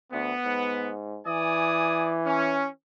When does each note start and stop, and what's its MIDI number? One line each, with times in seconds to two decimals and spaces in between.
0.13 0.33 38
0.13 0.91 59
0.45 1.21 44
1.26 2.69 52
1.26 2.15 74
1.26 2.15 80
1.26 2.15 87
2.25 2.68 61